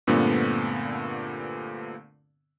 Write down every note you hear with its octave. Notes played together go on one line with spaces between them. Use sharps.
G2 A#2 D3 A3 B3 C4